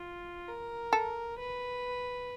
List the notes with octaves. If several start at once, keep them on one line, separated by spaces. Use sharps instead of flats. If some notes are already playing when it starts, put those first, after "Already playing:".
Already playing: F4
A#4
A4
B4